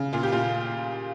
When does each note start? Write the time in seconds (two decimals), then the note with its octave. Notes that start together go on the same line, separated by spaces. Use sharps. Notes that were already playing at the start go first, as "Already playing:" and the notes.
Already playing: C#3
0.13 A#2 F4
0.23 G4
0.32 A#2 F4